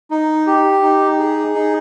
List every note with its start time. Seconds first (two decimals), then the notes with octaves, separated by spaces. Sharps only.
0.11 D#4
0.47 G4
0.82 D#4
1.19 G#4
1.55 D#4